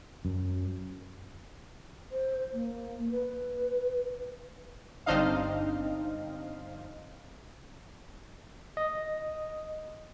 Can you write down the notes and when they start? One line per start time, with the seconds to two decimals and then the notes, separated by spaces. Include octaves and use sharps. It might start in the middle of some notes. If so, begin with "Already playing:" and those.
0.25 F#2
2.11 C5
2.54 A#3
3.11 B4
5.06 G1 C4 D4 D#4 D#5 F5
8.77 D#5